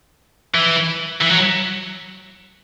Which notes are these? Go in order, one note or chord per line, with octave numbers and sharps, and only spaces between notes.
E3
E3
F#3